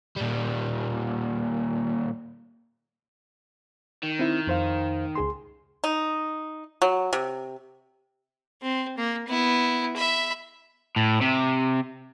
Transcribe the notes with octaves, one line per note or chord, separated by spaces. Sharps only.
A#2 G3
D#3
C4 E4
F2 C5 F5
C#2 G#4 C6
D#4
F#3
C3
C4
A#3
B3 E4
E5 B5
A2
C3